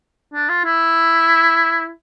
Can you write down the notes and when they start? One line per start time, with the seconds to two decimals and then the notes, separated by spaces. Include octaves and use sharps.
0.34 D4
0.49 F4
0.65 E4